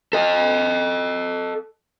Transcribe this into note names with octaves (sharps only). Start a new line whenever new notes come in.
A4 D#5